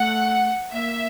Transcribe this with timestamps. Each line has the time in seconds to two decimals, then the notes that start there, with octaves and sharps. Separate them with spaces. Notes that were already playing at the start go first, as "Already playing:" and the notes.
Already playing: A3 F#5
0.72 A#3 E5